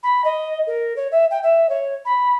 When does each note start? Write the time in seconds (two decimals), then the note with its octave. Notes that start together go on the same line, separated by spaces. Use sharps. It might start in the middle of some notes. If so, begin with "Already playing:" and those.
0.03 B5
0.24 D#5
0.66 A#4
0.96 C#5
1.11 E5
1.30 G5
1.42 E5
1.69 C#5
2.05 B5